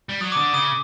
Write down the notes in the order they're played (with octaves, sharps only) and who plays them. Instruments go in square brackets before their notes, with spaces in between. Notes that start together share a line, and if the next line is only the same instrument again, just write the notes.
[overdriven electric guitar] G3
[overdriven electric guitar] F#3 [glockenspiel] D#6
[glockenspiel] D6
[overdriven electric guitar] D3 [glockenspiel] D#6
[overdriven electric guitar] C#3 [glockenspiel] D#6